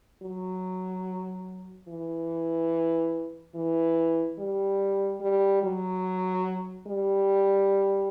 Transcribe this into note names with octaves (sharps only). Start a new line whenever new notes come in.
F#3
E3
E3
G3
G3
F#3
G3